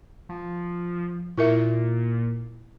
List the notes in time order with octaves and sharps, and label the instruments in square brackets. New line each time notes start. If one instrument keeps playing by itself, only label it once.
[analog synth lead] F3
[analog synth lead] A#2 [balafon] E4 A#4 E5